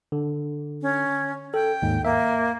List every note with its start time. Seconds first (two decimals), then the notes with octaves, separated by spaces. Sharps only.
0.12 D3
0.82 C#4
1.54 A4 G5
1.82 D#2 G#2
2.05 A#3 E5